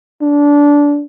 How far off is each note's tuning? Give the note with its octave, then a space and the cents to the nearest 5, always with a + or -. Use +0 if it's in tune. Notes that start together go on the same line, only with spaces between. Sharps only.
D4 -20